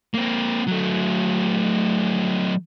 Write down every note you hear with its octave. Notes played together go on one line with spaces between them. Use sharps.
A#3 C4
F#3 A3